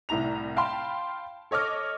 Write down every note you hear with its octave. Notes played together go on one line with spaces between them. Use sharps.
C2 A2 E4 A#5 F7
F5 G5 A5 B5 C6
A4 C#5 D#5 D6 F6